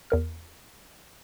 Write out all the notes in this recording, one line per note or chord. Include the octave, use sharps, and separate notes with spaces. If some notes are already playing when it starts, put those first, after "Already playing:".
E2 A#4 F6